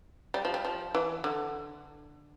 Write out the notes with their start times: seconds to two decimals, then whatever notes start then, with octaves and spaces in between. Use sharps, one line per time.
0.34 G3
0.45 F3
0.54 G3
0.65 F3
0.95 E3
1.24 D3